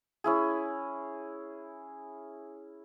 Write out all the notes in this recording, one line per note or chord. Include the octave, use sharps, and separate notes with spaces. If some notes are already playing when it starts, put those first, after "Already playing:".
C#4 E4 G#4